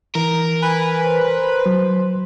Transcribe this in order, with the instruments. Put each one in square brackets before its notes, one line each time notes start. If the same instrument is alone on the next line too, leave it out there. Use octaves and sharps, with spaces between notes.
[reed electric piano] E3 [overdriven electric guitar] A#4
[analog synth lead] B4 [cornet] G#5
[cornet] C5
[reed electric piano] F#3